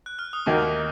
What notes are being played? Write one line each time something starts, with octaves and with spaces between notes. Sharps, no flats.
F#6
F6
D#6
D#2 D#3 A#3 D#4 F#4 C#6